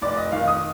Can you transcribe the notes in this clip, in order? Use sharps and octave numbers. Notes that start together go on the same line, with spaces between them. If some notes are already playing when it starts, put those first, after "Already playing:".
F1 D5
D#5
D#3 F5
D#6